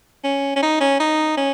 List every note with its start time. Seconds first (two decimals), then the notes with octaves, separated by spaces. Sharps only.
0.24 C#4
0.56 C#4
0.63 D#4
0.81 C#4
1.00 D#4
1.37 C#4